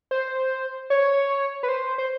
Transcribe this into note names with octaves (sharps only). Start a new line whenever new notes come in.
C5
C#5
B4
C5
C5